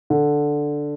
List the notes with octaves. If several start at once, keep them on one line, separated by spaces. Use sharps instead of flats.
D3